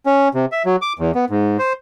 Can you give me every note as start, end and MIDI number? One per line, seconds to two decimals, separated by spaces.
0.06 0.28 61
0.34 0.46 48
0.52 0.63 76
0.65 0.76 54
0.82 0.93 86
0.99 1.12 40
1.15 1.25 59
1.30 1.57 44
1.59 1.73 72